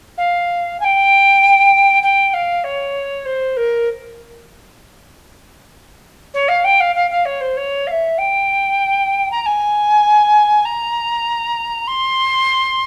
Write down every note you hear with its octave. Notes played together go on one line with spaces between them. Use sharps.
F5
G#5
G5
G5
F5
C#5
C5
A#4
C#5
F5
G5
F5
F5
F5
C#5
C5
C#5
F5
E5
G5
A#5
A#5
G#5
A#5
C6